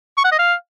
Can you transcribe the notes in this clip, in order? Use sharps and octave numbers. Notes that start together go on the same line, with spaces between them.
C#6
F#5
D#5
F5